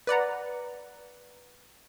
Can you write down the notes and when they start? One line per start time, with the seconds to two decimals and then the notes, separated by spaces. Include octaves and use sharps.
0.07 B4 D5 F#5 A#5